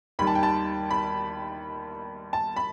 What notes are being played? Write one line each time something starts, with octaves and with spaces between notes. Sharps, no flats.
D#2 D#3 G3 B5
A5
G5
A5
B5
A5
B5